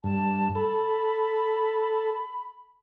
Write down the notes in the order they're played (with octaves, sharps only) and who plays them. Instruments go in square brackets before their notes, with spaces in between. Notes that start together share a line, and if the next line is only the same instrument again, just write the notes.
[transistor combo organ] G2 [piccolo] A5
[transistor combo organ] A4 [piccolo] B5